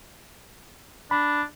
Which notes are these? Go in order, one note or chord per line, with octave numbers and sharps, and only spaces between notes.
D4 B5